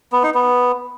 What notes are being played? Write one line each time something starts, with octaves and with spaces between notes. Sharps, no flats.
B3
D#4
B3